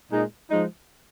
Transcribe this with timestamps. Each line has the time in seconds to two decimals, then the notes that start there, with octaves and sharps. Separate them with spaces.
0.08 A#2 G#3 D#4
0.49 F3 G#3 D#4